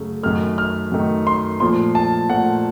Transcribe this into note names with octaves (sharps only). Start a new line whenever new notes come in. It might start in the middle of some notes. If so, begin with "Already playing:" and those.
Already playing: F#2 C#3 A3
F#2 D#3 A3 F6
F6
F#2 D#3 A3
C6
A#2 F3 A3 C6
A5
A#2 F3 A3 F#5